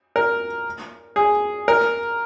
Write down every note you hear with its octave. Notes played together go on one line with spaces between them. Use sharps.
A#4
G#4
A#4